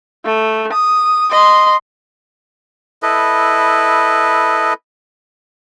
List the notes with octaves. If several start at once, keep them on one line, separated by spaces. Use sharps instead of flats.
A3
D#6
D#5 C6
E4 A4 B4 D#5